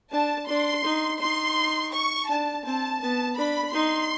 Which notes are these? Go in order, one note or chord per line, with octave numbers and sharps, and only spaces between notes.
D4 A5
D4 C6
D#4
D#4 C6
C#6
D4 A5
C4 A5
B3 A5
D4 B5
D#4 C6